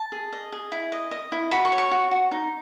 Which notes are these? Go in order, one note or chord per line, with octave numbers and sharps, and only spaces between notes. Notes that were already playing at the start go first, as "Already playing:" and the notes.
Already playing: A5
G#4
D#5
G#4
E4
D#5
D#5
E4
F#4 B5
C#6
C#5
C#6
F#4
F#4
D#4